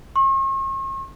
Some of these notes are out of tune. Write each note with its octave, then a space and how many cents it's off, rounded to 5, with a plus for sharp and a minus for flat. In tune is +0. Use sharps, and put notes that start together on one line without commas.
C#6 -45